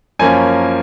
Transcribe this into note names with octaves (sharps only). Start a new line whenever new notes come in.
F#2 F3 A#3 C#4 G#5